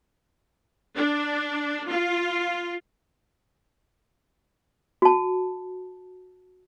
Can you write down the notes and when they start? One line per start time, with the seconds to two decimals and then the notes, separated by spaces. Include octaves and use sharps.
0.95 D4
1.88 F4
5.02 F#4 A5